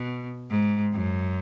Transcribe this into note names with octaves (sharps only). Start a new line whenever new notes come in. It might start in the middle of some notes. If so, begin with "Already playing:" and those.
Already playing: B2
G#2
F#2